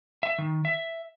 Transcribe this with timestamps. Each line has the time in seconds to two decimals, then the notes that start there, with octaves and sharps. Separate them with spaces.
0.23 E5
0.38 D#3
0.65 E5